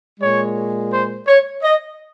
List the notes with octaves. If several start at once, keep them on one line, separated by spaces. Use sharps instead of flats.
A#2 G#3 C#5
C5
C#5
D#5